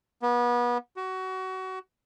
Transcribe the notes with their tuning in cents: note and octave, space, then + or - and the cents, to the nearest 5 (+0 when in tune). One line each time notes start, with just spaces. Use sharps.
B3 -30
F#4 +25